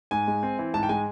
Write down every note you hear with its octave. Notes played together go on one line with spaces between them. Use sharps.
G#2 G#5
G#3
C4
E3
G#2 A5
G5
G#3 G#5